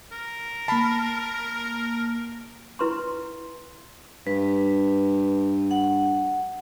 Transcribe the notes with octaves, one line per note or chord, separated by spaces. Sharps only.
A#4
A#3 A5 B5 C7
E4 B4 C6 C#6
G2 B4
F#5